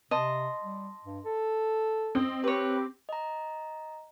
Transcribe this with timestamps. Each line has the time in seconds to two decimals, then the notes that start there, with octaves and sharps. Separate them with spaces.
0.11 C3 D#5 A5 C6
0.64 G3
1.04 G2
1.25 A4
2.15 C4 D#5
2.44 G4 B4 C#5
3.09 D#5 A#5